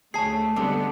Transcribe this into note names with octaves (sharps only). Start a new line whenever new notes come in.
D2 A3 G#4 C#5 A5 C7
D3 G3 G#3 B3 C4 D4